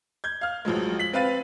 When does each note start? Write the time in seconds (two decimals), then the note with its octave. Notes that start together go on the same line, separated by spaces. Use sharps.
0.24 G6 G#6
0.41 F5 F6
0.65 A1 F3 F#3 G#3
0.99 B6 F#7
1.13 C4 B4 F5 A6 D#7